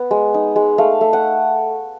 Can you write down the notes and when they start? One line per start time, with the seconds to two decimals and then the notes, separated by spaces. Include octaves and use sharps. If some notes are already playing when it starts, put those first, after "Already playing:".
Already playing: B3
0.11 G#3
0.34 D#4
0.56 G#3
0.78 A3 F5
1.01 A3
1.13 F#5